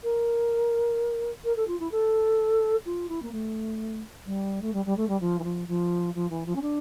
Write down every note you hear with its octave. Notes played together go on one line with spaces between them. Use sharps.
A#4
A#4
A4
F4
E4
A4
F4
E4
A#3
A3
G3
A3
G3
G3
A3
G3
F3
E3
F3
F3
F3
E3
F3
C#4
D4